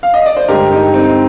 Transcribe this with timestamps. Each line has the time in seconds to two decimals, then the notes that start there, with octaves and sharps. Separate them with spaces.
0.03 F5
0.14 D#5
0.26 D5
0.37 C5
0.48 G2 D3 G#3 G4 A#4
0.71 D#4 G4
0.94 C4 D#4